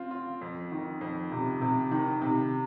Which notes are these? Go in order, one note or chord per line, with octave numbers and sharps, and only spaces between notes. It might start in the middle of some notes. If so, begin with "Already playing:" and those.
Already playing: C4 F4
F4
F2
D#3
F2
C3
C3
D#3
C3